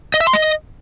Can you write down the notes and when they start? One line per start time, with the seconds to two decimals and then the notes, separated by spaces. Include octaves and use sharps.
0.14 D#5
0.20 E5
0.27 C6
0.33 D#5